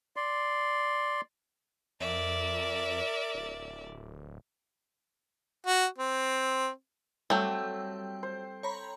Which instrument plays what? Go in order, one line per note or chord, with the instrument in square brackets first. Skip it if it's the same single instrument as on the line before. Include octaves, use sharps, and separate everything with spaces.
[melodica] D5 C6
[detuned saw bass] F2 [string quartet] A#4 D5 E5
[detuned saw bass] D1
[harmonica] F#4
C4
[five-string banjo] F#3 A3 [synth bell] G3 [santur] C4 A4 G5
[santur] C5
[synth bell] C#5 A#5 B5